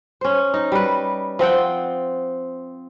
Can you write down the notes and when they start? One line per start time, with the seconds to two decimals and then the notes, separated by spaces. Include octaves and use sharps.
0.21 C#4 C5
0.54 D#4
0.72 G3 B4
1.39 F3 C4 F#5 G5